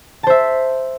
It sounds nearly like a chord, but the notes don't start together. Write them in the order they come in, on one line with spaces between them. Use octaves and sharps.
A5 C5 E5